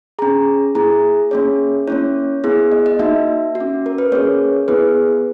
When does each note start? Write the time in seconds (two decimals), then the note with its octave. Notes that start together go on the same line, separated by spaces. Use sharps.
0.19 C#4 G#4 A#5
0.75 A#3 E4 G#4 A#5
1.31 A#3 C#4 G#4 C#5
1.88 A#3 C#4 E4 C#5
2.44 B3 E4 G#4
2.72 D#5
2.86 D#5
2.99 A#3 D#4 F#4 E5
3.55 F#4
3.60 C#4
3.86 A#4
3.98 B4
4.12 A#3 C#4 G#4 C#5
4.68 B3 E4 G#4 B4